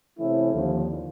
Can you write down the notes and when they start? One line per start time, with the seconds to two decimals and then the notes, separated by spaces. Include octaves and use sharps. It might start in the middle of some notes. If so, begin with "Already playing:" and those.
0.18 C3 E3 A3 C#4 E4
0.53 D#2 D3 F3